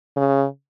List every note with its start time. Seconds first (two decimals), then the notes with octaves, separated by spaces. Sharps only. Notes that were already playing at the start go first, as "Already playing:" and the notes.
0.17 C#3